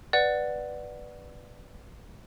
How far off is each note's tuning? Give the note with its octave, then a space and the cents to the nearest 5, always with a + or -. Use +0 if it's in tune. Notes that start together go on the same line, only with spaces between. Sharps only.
B4 +0 D5 +10 F#5 +0